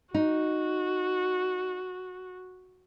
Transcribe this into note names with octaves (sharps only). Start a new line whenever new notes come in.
D#4 F#4